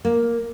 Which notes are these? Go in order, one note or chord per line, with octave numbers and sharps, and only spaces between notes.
A#3